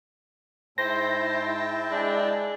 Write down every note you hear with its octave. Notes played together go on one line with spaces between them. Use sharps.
G#2 E4 C5 G5 A5 A#6
G#3 D4